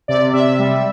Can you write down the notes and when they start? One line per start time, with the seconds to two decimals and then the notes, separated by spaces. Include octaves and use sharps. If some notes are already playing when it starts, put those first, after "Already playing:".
0.08 C3 D5
0.33 C3 E5
0.59 G3